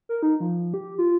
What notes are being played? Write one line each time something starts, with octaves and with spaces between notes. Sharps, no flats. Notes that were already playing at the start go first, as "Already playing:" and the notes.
A#4
D#4
F3
G4
F4